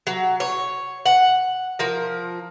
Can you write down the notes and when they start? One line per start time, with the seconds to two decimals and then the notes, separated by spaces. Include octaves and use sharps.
0.07 F#3
0.40 C#5
1.06 F#5
1.79 F3 A#4